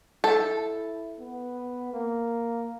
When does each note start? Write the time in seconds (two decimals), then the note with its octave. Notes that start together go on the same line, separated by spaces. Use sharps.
0.24 E4 A4
1.19 B3
1.93 A#3